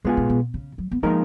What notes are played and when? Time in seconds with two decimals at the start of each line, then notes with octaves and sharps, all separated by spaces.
0.04 C#3 G#3 B3 F4 G#4
0.17 B2
0.29 B2
0.54 C#3
0.78 F#3
0.91 B3
1.03 F3 G#3 A#3 D#4 A#4